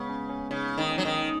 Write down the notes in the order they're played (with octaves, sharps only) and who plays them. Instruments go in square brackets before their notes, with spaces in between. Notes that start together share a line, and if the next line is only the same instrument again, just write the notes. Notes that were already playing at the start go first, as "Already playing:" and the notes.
Already playing: [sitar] C#3 [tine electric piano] G#3 B3
[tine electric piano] C#4
C#4
[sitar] C#3 [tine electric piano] D#4
[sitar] D#3
[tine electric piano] C#4
[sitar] F#3
D#3